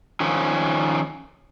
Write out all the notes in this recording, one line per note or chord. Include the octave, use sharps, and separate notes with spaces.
D#3 F3 C#4